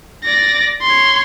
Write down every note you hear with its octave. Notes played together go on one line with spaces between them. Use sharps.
D5 A#6
C#5 C6